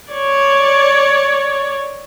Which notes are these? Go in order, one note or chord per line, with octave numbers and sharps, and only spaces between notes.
C#5 D5